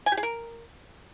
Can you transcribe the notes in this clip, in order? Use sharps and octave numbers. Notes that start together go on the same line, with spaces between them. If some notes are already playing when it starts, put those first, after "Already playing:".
G#5
G4
G#4
A#4